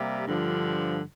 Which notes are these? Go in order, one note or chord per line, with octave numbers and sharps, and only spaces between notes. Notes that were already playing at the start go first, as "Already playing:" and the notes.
Already playing: C3 G3 A#3
G2 D3 F3